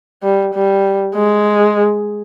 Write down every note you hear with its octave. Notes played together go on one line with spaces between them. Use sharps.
G3
G3
G#3